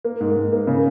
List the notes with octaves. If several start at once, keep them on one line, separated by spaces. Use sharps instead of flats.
A#3
G#2
G#2
A#3
C#3